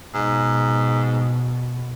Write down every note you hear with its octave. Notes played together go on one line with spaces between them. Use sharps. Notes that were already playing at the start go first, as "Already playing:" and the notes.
G#2 B2